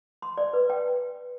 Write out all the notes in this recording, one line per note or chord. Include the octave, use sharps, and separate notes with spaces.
C6
D5
B4
G5